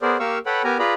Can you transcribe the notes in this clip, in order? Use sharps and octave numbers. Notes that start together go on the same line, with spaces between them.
B3 G#4 A#4 C5 D5
A#3 G4 A#4 F5 C#6 E6
A4 B4 C#5 F#5 G5 B5
B3 G4 A#4 G#5 A#5
F4 G#4 B4 D5 A#5 B5